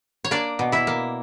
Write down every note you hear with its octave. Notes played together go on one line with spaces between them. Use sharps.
C#5
A#3 D4 D5
B2
E4 E5
A#3